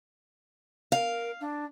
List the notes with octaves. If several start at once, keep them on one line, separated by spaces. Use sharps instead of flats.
A#4 F5
D4